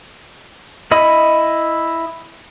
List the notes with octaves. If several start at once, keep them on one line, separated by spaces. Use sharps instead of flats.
E4 D#5 B5